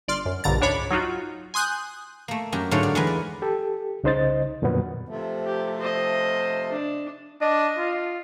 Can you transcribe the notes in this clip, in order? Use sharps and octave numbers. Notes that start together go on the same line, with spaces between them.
G1 D5 C6 F6
F#2
A#1 G2 B2 D3 A#5 A6
C#2 G#2 D4 C#5 B5 D6
F#3 D#4 F4 F#4
G#5 C6 D#6 F#6 G6
A3 A#3
F#2 G4 A#4
G#2 D3 F#3 A3 C#5 F5
D5
E2 G#3 A#4 B4 G#5
D5
G4 A4
C2 C#3 D#4 C5 D#5 A6
F2 A#2 D3 F#3 B3
C3 F3 A3
G4
C5 D#5
D4
D4 D#5
F4